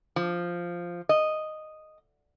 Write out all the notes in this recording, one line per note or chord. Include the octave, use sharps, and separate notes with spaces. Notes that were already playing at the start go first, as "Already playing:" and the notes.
F3
D#5